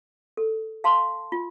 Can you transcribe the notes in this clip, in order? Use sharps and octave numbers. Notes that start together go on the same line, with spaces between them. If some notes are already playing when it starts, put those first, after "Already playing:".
A4
F5 A5 C6
F4